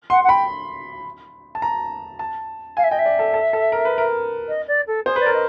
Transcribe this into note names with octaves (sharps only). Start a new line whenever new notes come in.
F#5 C6
F#5
G5 B5
A5
A#5
A5
F5 G#5
E5
D#5 G5
E5
D5
A4
A4
A4
A#4
B4
A#4
D#5
D5
A4
G#4 C5
B4 D5
A#4
D#5